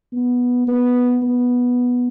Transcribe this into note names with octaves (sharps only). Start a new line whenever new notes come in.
B3
B3
B3